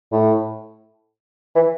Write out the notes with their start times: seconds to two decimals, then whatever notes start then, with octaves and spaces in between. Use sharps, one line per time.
0.12 A2
1.55 E3